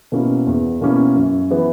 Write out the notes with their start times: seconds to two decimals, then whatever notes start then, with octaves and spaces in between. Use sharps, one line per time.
0.12 B2 A#3 C#4 E4
0.47 E2
0.81 B2 A#3 C#4 E4
1.16 F#2
1.51 E3 B3